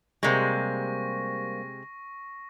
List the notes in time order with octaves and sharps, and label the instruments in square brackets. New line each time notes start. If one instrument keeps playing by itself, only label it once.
[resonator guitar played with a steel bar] C3 G#3 [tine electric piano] G3 A#3 C5 [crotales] C#6 A#6